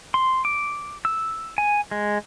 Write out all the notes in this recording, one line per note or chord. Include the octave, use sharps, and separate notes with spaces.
C6
D6
E6
G#5
G#3